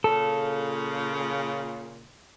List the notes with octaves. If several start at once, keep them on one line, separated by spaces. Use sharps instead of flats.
A#2 C#3 A4